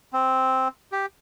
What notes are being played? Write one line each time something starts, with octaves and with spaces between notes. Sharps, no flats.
C4
G4